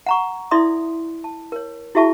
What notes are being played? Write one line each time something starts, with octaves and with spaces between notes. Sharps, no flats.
F#5 A#5 C#6
E4 A4 D5 E5 C6 D#6
A5
A#4 C#5
E4 F#4 G#4 E5 A5 C#6